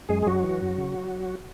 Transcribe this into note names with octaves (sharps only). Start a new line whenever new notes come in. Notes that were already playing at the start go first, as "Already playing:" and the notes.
F#2 G#3 G#4
G#4
F#2 F#3 F#4
E3
F#2
C#3